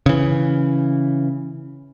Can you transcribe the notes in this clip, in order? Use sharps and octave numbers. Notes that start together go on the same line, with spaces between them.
C#3 E3